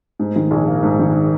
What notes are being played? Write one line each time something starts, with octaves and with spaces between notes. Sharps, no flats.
G#2
D#3
A#1
A#3
G#2
D#3